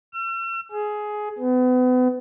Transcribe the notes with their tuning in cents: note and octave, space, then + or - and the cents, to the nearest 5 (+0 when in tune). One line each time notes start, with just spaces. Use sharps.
E6 +45
G#4 +15
B3 +35